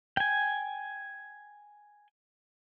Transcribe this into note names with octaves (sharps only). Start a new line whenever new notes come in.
G5 G#5